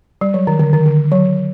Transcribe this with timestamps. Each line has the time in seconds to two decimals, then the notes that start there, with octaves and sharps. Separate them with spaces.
0.21 G3
0.34 F#3
0.47 D#3
0.59 D3
0.73 D#3
0.86 D3
1.12 F#3